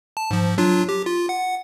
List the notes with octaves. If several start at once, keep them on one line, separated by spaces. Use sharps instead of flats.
A5
G#2 F3
F#3 D4 F4
G4
F4
F#5